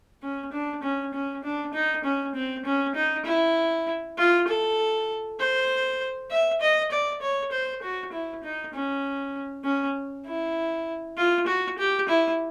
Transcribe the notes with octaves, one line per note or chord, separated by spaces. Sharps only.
C#4
D4
C#4
C#4
D4
D#4
C#4
C4
C#4
D#4
E4
F4
A4
C5
E5
D#5
D5
C#5
C5
F#4
E4
D#4
C#4
C#4
E4
F4
F#4
G4
E4